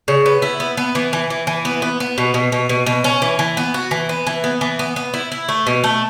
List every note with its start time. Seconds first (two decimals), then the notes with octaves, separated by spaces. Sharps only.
0.08 C#3
0.26 B3
0.42 E4
0.60 B3
0.77 B3
0.95 E3
1.13 E3
1.30 E3
1.47 E3
1.65 B3
1.82 B3
2.00 B3
2.18 B2
2.34 B2
2.52 B2
2.69 B2
2.86 B2
3.04 C#4
3.22 E3
3.39 E3
3.57 B3
3.74 F#4
3.91 E3
4.09 B3
4.27 E3
4.44 B3
4.61 E3
4.79 B3
4.96 B3
5.14 E4
5.32 E4
5.49 A3
5.67 B2
5.84 A3